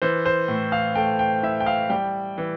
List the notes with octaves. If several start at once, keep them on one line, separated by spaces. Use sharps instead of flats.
E3 C5
C5
A2
F5
A3 G5
G5
E4 E5
G5
F5
G3 G5
E3